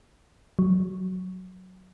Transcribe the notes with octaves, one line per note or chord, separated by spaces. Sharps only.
F#3